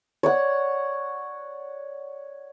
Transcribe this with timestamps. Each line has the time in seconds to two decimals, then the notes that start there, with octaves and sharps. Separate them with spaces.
0.23 C#5 D5 F#5